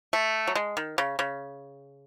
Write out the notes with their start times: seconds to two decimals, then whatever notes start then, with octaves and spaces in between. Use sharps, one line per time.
0.13 A3
0.47 F#3
0.55 G#3
0.77 D#3
0.98 C#3
1.19 C#3